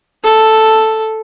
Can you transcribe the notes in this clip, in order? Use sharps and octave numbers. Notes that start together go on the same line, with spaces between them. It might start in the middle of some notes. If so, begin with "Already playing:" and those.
A4